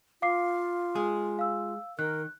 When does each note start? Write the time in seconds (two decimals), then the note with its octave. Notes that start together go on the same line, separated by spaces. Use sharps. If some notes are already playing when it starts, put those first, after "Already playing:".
0.22 F4 F5 D6 C7
0.95 G#3 G#4
1.39 F5 E6
1.99 D#3 A#4 F#6